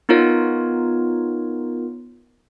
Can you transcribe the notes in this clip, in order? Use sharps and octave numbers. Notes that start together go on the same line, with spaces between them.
B3 D#4 F4 A#4 C#5